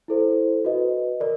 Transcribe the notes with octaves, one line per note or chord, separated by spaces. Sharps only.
E4 A4 C5
F#4 B4 D#5
A#4 D5